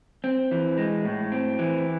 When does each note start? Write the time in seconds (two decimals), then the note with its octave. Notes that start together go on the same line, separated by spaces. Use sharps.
0.24 C4
0.51 E3
0.78 G#3
1.05 A2
1.32 C4
1.59 E3